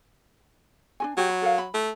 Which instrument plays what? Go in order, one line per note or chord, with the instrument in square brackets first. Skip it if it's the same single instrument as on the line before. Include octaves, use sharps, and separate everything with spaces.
[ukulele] D4 F#4 G#5
[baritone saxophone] F#3 [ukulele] F#4 G4
[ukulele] B5
A4 A#4 F5
B5
[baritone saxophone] A3